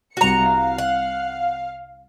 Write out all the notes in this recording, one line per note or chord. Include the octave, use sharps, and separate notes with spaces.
C2 F#4 A#5 C#7
F5
F#5